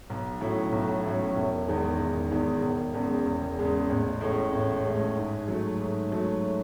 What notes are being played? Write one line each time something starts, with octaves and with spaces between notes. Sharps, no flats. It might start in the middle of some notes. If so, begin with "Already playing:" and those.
B1
A2 F#3 C#4 E4
B1
A2 F#3 C#4 E4
E1
E2 D#3 G#3
E1
E2 D#3 G#3
E1
E2 C#3 G#3
E1
E2 C#3 G#3
A1
A2 G#3 C#4
A1
A2 G#3 C#4
G#2
F#3 A3
G#2
F#3 A3